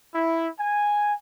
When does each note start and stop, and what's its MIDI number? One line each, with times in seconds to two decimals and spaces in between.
0.14 0.47 64
0.59 1.13 80